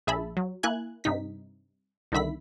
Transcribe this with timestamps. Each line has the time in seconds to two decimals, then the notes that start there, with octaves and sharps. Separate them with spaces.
0.07 A#1 G#4 E5 A5 B5
0.37 F#3
0.63 A#3 E4 G#5 F#6 G#6
1.04 G2 C3 D#4 B6
2.12 C2 D3 D#3 E5 B5 B6